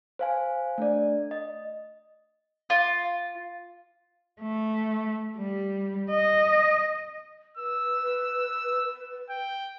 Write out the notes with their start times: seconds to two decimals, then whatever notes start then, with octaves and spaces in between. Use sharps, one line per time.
0.19 C5 F5 G#5
0.78 A3 D4 D5
1.31 D#5
2.70 F4
4.41 A3
5.37 G3
6.11 D#5
7.57 B4 E6
9.30 G5